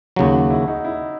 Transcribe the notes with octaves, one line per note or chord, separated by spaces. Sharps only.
D#2 C#3 F#3 F#4
F#4
E4
D#4
E4